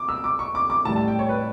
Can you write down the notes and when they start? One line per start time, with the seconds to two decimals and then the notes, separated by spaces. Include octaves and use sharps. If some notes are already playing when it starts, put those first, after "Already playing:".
Already playing: D6
0.09 E6
0.24 D6
0.39 C#6
0.55 D6
0.70 D6
0.85 A1 A2 G3 A5
0.96 A5
1.08 G5
1.19 C#5
1.29 B4